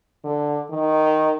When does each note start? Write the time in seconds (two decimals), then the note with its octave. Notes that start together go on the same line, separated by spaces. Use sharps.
0.24 D3
0.70 D#3